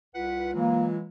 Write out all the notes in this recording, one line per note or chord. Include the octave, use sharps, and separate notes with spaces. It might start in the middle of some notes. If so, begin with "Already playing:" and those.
C2 F4 B4 F#5
E3 F#3 G#3 A#3